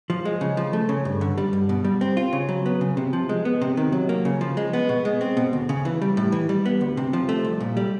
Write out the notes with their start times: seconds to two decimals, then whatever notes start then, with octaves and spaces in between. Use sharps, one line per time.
0.10 F3
0.25 G#3
0.41 C#3
0.57 F3
0.73 A3
0.89 C#3
1.05 G2
1.21 D3
1.38 G3
1.53 G2
1.69 B2
1.84 G3
2.01 C4
2.17 F4
2.33 C#3
2.49 F#3
2.66 B3
2.81 C#3
2.97 C3
3.13 F3
3.29 G#3
3.45 B3
3.61 C3
3.77 D#3
3.92 F#3
4.09 A#3
4.25 C#3
4.41 F3
4.57 G#3
4.73 B3
4.89 B2
5.05 G#3
5.21 C4
5.37 B2
5.53 D2
5.69 C#3
5.85 E3
6.02 G3
6.17 A2
6.32 E3
6.49 G3
6.66 B3
6.81 D2
6.97 C3
7.13 F3
7.29 A3
7.45 C2
7.60 A#2
7.77 G3